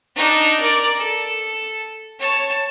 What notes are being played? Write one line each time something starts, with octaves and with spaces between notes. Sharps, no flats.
D4 D#4
A#4 D5
A4
C#5 A5